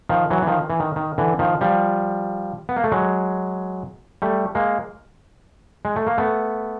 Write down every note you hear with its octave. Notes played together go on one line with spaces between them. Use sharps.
D#3 F3
E3 F#3
E3
D#3 F3
E3
D#3
D#3
D3 E3
D#3 F3
F3 G3
B3
A#3
A3
F#3 G#3
G3 A3
G#3 A#3
G#3
A3
A#3
A3 B3